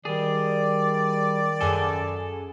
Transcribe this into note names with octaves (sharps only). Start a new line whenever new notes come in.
D#3 G3 G#4 D5
F#2 G#4 A4 G#5